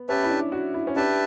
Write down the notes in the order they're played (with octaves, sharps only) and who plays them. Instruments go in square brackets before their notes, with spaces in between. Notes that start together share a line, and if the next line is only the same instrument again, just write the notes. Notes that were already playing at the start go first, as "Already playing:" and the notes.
Already playing: [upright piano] B3
[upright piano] C#4 [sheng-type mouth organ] G4 B4 E5 A5
[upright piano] E4
D4
F#4
E4
C#4
[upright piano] D4 [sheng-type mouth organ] G4 B4 E5 A5